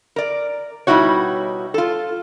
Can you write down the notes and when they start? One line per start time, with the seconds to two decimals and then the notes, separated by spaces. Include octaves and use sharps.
0.16 A#4 D5
0.87 B2 G3 D#4 E4 F#4 C#5
1.74 F4 A4